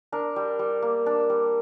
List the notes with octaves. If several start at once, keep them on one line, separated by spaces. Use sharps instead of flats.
D4 A#4
G3
G3
A#3
D4
G3